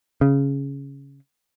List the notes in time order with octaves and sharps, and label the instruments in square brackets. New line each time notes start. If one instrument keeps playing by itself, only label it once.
[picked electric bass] C#3